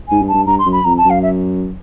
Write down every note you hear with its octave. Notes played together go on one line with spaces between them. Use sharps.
G#2 G#5
G2
A5
G2
G2 A#5
C6
F#2
B5
F2 A#5
A5
F#2
F5
E5